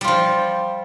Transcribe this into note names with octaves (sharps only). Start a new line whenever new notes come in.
F3 G3 F4